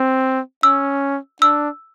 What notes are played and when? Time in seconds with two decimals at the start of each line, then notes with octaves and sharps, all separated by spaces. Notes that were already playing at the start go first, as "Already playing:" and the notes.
Already playing: C4
0.63 C#4 E6
1.42 D4 E6